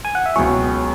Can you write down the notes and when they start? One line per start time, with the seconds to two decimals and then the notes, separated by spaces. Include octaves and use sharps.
0.05 G#5
0.15 F#5
0.26 E5
0.36 C#2 B2 F#3 E4 G#4 C#5